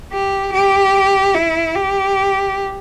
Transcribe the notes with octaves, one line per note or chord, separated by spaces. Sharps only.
G4
G4
E4
G4